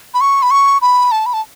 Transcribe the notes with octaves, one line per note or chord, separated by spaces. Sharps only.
B5
C#6
B5
C#6
B5
A5
B5
A5